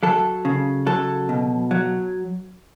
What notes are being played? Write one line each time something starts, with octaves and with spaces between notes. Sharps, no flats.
F#3 A4
C#3
F#3 A4
B2
F#3